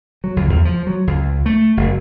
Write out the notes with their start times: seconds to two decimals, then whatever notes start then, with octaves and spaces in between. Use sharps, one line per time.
0.24 F#3
0.36 C#2
0.49 E2
0.65 F3
0.87 F#3
1.07 C#2
1.46 A3
1.77 F#1